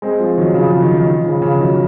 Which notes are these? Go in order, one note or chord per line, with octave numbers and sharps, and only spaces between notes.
G#3 C4
F3 G#3
D#3 F#3
C#3 F3
C#3
D#3
D#3
D#3
C#3 F3
C#3
D#3 F#3